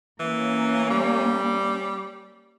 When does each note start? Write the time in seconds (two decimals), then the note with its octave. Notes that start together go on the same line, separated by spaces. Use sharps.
0.20 E3 A#3 C#4
0.90 G3